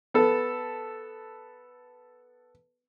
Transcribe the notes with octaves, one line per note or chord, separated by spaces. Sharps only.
B3 A4